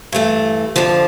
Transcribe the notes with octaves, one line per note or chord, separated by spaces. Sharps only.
G2 E3 A3
F2 D3 F3